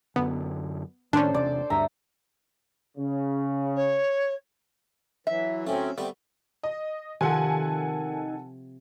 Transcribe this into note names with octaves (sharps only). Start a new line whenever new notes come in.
F#2 D3 B3
A2 D#3 C#4 D4 A4 C5
E1 C3 D5
D2 G2 D4 E5 A#5
C#3
C#5
E3 F#3 E5
A2 F#3 A3 C4 C#4
G3 A3 B3 C4
D#5
C3 D#3 F3 A4 F#5 G#5